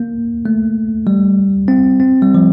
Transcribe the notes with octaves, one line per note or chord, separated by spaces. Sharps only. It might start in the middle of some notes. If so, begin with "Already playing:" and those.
Already playing: A#3
A3
G3
C4
C4
G3
F3